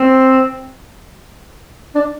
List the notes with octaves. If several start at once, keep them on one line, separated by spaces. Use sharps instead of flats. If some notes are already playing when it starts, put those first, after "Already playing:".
Already playing: C4
D4